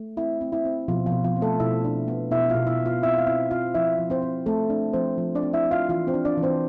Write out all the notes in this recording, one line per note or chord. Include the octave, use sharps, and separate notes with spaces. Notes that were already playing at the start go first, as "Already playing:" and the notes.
Already playing: A3
C4 E4
C4
E4
C4
B2 F3 F4
F3 F4
B2
F3 F4
C4
A3 A4
B2 E4 E5
D4
B3
B2 E4 E5
F4 F5
B2
E4 E5
B3
F4 F5
C4 E4 E5
F5
C4 E4 E5
C4 F4 F5
F3 E4 E5
F3
C4 C5
C4
A3 C4 A4
C4 D4
F3 C4 C5
F3
D4 D5
C4
E4 E5
C4
F4 F5
E3 F4 F5
C4 C5
D4
D4 D5
E3
C4 C5